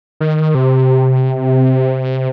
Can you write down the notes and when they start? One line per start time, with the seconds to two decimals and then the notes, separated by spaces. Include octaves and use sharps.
0.20 D#3
0.55 C3